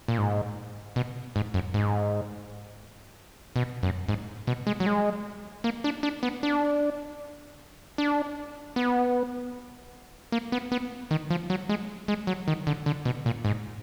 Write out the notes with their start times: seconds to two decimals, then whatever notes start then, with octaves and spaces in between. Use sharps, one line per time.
0.08 A#2
0.18 G#2
0.96 B2
1.36 G#2
1.54 F#2
1.74 G#2
3.56 B2
3.83 F#2
4.08 G#2
4.47 B2
4.67 G#3
4.80 F#3
4.86 G#3
5.64 A#3
5.84 D4
6.03 D4
6.23 B3
6.43 D4
7.98 D4
8.76 B3
10.32 A#3
10.52 B3
10.72 B3
11.11 D#3
11.30 F3
11.50 F#3
11.69 G#3
12.08 G#3
12.27 F#3
12.48 D#3
12.67 D3
12.86 D3
13.05 B2
13.26 A#2
13.45 G#2